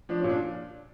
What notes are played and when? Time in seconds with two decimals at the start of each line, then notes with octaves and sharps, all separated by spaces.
0.09 F3 D4
0.19 A#2 C#4
0.29 D4